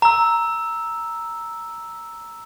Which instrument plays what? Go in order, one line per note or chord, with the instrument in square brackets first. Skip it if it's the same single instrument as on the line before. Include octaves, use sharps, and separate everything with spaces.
[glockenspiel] A#5 E6